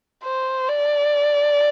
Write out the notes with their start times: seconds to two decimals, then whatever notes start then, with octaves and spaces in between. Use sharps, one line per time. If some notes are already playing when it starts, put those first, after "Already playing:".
0.24 C5
0.69 D5